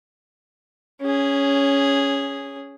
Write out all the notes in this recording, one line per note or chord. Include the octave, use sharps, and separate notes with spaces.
C#4 G#4